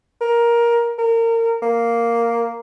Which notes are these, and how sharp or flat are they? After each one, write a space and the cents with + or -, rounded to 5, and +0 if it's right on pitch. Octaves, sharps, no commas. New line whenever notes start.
A#4 +15
A#4 -25
A#3 +0